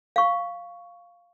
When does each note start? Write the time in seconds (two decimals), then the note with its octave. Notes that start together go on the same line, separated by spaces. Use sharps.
0.16 F5 C#6